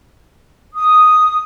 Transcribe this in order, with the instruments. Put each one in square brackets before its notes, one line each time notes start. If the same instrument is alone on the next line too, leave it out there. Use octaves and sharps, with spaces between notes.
[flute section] D#6